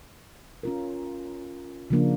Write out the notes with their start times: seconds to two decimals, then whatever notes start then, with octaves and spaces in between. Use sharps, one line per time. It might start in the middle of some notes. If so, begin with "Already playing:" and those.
0.63 C#4 F4 A#4
1.90 C#3 F3 A#3 D4